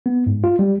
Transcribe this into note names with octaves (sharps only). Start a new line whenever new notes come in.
B3
G#2
F4
G3